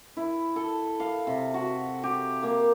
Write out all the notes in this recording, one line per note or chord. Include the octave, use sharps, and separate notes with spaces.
E4
A4
F5
C3
F#4
G4
A#3